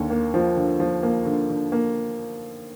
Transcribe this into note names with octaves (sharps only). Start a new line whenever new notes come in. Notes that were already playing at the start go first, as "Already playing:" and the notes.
Already playing: D#2 D3 A#3
A#3
F3
D3
F3
A#3
D3
D3
A#3